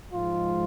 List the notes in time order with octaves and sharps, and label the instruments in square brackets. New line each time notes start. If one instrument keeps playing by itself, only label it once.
[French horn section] G#2 F3 G#3 [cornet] F4